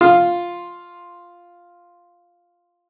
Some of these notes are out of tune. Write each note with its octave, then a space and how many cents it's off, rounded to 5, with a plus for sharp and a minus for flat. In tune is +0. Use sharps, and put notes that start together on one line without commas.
F4 +0 F5 +0 C6 +0